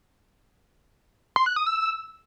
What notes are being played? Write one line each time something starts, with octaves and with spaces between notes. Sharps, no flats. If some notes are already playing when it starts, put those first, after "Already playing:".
C6
F#6
D#6
E6